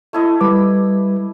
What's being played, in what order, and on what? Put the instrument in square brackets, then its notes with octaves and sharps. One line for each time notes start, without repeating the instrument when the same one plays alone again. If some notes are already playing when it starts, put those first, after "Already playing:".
[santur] A3 E4 D#5
[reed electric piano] G3 B4 D6 [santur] B5